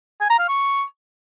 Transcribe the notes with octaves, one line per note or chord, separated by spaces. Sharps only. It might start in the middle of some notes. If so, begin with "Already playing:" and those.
G#5
A#5
F5
C#6